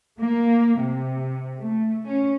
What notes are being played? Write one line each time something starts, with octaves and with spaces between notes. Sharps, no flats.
A#3
C3
A3
C#4